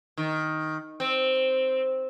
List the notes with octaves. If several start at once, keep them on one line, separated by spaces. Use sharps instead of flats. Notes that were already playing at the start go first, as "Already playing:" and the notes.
D#3
C4